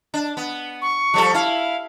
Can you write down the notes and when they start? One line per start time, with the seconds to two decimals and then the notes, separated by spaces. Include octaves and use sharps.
0.14 D4
0.37 B3
0.82 C#6
1.14 F3 G3 A4
1.34 E4 F5